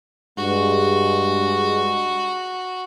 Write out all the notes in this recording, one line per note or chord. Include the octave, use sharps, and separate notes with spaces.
G2 G#3 F#4